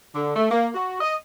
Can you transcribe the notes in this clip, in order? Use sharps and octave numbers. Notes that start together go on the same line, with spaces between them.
D3
A3
A#3
F#4
D#5